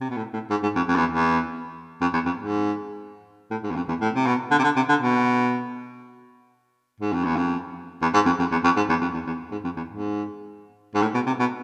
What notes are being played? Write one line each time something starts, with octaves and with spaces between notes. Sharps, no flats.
C3
B2
A2
A2
G#2
G#2
F2
F2
E2
E2
F2
E2
F2
G#2
A2
G#2
E2
F2
E2
A2
C3
B2
D3
C3
D3
C3
D3
B2
G#2
F2
E2
F2
E2
G#2
F2
F2
E2
F2
G#2
E2
F2
E2
E2
G#2
F2
E2
G#2
G#2
A2
B2
C3
B2